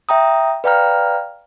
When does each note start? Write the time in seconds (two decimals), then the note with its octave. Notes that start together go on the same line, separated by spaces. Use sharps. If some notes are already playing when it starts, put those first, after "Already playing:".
0.09 E5 G5 A#5 D#6
0.64 B4 D5 F5 G5 A#5 F6